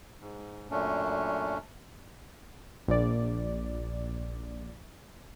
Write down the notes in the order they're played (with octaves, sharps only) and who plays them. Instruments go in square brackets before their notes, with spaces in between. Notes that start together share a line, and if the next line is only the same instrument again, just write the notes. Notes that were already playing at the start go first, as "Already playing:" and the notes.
[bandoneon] G#2
F#2 A#2 A3 C#4 D4
[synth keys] A#1 D5